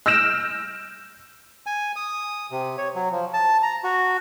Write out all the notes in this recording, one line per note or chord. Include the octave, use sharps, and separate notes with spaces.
E6 F6 G6 A#6 D7 E7
G#5
D#6
C3
C#5
F#3
F3
A5
A#5
F#4